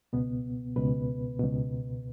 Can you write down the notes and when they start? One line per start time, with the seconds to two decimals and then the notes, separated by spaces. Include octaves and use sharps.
0.13 C#2 B2 B3
0.76 C#2 B2 B4
1.39 C#2 B2